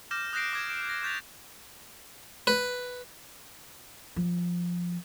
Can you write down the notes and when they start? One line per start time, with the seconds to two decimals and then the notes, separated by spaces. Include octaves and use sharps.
0.11 D6 F6 G6 A#6 E7
0.33 D#6 F#6 G6 A#6 C7 D7
0.53 D6 G#6
0.70 D7
0.89 A#6
1.03 C#6 G6 A6 B6 F7
2.47 B4
4.16 F3